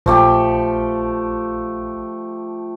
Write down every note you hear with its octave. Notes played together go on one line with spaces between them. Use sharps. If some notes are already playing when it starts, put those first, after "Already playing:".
A#1 F3 A3 G4